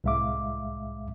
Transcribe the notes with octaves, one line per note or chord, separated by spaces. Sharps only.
C2 A2 G#3 E5 F5 D6